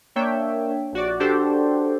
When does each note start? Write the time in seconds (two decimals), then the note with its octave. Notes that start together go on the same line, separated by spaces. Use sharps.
0.16 A#3 D4 C#5 E5 G5
0.93 A#1 F#4 D5
1.20 D4 F#4 G4 A4 C5